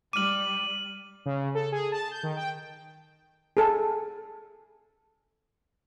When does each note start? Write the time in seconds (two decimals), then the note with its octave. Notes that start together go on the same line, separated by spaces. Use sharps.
0.13 G3 D6 F6 D#7 F#7
1.26 C#3
1.55 A4
1.72 G#4
1.92 A5
2.11 G6
2.23 D#3
2.37 G5
3.57 G#4 A4